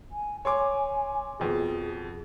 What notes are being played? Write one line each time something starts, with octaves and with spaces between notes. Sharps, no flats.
G#5
C#5 G#5 C6 D6
F2 B2 G#4